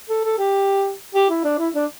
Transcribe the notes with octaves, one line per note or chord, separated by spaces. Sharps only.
A4
A4
G4
G4
E4
D4
E4
D4